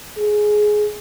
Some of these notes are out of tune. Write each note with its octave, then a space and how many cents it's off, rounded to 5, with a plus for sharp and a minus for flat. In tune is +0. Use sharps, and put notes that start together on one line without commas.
G#4 +10